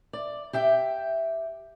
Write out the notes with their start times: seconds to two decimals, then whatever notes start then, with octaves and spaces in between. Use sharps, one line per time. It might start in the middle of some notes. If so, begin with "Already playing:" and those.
0.13 D5
0.53 G4 E5 G5